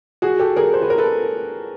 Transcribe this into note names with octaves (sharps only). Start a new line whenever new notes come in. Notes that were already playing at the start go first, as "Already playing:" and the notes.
F#4 G#4
G4 A4
G#4 A#4
C5
B4
A#4
A4 B4